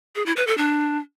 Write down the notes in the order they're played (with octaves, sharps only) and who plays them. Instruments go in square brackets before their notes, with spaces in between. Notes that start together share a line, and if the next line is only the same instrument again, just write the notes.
[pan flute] G#4
E4
B4
A4
D4